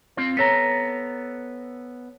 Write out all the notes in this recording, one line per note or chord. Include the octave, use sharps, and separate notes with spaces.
C4 F4 C5
B3 A4 C#5 A#5 B6